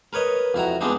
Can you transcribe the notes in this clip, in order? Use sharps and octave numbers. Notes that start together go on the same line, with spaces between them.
A#4 B4 C#5 D#5
F2 E4 F#4 A#5
F3 G#3 B3 C4 D4 D#4